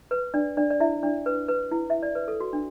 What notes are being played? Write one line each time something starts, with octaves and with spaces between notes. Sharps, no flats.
B4
D4 D5
D4 D5
D5
E4 E5
D4 D5
B4
B4
E4
E5
D5
B4
A4
F#4
D4